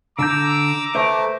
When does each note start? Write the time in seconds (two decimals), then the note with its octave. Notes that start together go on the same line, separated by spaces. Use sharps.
0.19 D3 D4 A#5 D6 E6 G6
0.95 A3 B4 C5 E5